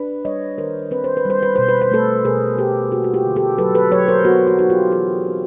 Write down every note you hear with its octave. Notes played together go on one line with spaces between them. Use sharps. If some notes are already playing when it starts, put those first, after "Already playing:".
Already playing: D4 B4
G3 C#5 D#5
D#3 A#4 C5
C4 B4
C5
B4
G3 C5
B4
B2 C5
B4
C5
A3 A4 B4
B2 G#4 A#4
B3 G4 A4
A#3 F#4 G#4
F#4
F4 G4
D3
G4 A4
F#3 A4 B4
A4 B4
F#3 B4 C#5
A#4 C5
B3 F#4
F#4
D#4 F#4
F4 G4
E3 F#4 G#4
C4